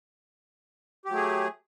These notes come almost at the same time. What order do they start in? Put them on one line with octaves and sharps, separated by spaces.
G4 F#3 A3 G#4